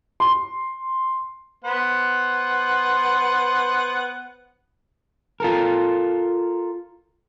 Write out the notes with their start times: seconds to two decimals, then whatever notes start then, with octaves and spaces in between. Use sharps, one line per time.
0.20 C6
1.64 B3 C5 F#5
5.40 F4 A4 A#4